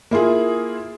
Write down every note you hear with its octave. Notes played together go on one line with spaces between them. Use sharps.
A#3 E4 F4 G#4